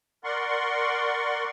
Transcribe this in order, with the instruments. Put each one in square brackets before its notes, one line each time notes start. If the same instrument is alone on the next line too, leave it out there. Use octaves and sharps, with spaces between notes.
[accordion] A#4 D5 F#5 C6 C#6